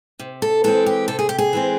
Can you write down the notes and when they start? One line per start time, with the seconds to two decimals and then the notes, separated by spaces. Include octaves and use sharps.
0.19 C3
0.42 A4
0.64 E3 G#3 C4 A4
0.86 G4
1.08 C3 A4
1.19 G#4
1.29 G4
1.38 G#4
1.53 E3 G#3 C4